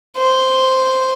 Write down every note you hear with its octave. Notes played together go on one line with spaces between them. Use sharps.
C5